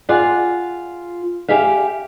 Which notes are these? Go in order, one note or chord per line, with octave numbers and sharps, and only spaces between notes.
F4 G#4 D5 F5 F#5
G4 G#4 E5 F5